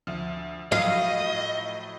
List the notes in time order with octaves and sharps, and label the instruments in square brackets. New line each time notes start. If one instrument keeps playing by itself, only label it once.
[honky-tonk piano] D2 F3
[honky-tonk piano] A2 F3 F#3 [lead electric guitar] D#5 [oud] F5